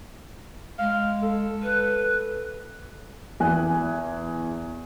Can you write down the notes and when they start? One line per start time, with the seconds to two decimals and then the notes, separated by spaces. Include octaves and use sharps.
0.79 G#3 F5
1.22 A4
1.63 B4
3.40 E2 G#5 F#6